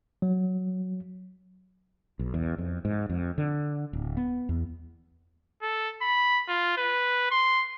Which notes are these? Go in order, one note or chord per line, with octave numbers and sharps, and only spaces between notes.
F#3
B1
E2
F2
G#2
F2
D3
D1
B3
E2
A4
B5
F4
B4
C6